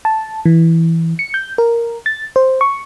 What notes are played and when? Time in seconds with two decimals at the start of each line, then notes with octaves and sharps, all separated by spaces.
0.05 A5
0.46 E3
1.19 C#7
1.34 G6
1.58 A#4
2.06 A6
2.36 C5
2.61 C#6